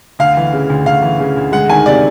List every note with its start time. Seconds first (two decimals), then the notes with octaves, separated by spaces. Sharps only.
0.19 D2 F5
0.37 E3
0.53 C#3
0.70 D2
0.86 D2 F5
1.02 E3
1.20 C#3
1.37 D2
1.52 G#3 F#5
1.69 D#3 G#5
1.86 C3 D5